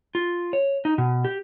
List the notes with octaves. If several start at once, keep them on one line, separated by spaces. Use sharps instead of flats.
F4
C#5
D#4
B2
G4